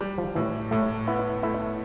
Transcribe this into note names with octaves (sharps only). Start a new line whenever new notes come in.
G3
F3
A2 E3
A2 A3
B3 E4
A3 E4